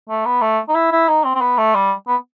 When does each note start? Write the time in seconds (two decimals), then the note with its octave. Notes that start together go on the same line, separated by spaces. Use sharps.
0.09 A3
0.26 B3
0.41 A3
0.68 D#4
0.75 E4
0.92 E4
1.08 D#4
1.24 C4
1.35 C4
1.41 B3
1.57 A3
1.74 G3
2.08 B3